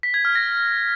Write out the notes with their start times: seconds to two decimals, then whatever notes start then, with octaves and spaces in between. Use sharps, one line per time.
0.03 B6
0.14 G#6
0.25 F6
0.35 A#6